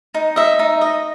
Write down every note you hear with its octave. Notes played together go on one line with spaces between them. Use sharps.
D#4
D#5 E5
D#4
D#5